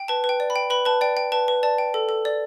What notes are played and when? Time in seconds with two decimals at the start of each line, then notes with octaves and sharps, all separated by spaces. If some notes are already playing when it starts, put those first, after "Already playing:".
Already playing: G5
0.08 B4 A5
0.24 B4
0.29 G5
0.40 D5
0.50 B5
0.56 G5
0.70 B4 B5
0.85 B4 A5
1.01 D5 G5
1.17 G5
1.32 B4 A5
1.48 B4
1.63 D5 A5
1.78 G5
1.94 A4
2.09 A4
2.25 D5